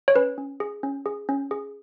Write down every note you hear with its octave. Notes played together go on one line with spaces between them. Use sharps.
C#5
C#4 B4
C#4
G#4
C#4
G#4
C#4
G#4